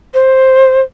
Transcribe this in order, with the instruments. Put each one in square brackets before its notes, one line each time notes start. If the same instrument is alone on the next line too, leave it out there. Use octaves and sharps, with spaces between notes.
[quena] C5